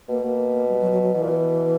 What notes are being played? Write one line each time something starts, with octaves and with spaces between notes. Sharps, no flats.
B2 A#3
B2 A#3
G3
F#3
F#3
F#3
B2 E3
A#2
B2